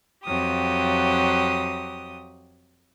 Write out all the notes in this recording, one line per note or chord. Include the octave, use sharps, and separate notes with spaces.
F2 F#3 G4 D#6